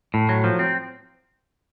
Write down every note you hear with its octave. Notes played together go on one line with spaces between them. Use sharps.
A2
F#3
F3
C4